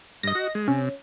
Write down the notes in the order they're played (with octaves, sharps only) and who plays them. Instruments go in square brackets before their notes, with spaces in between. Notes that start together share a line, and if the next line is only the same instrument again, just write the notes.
[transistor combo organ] G2 [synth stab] D#5 A#6
[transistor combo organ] F#4
G#3
[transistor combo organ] C3 [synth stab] C#4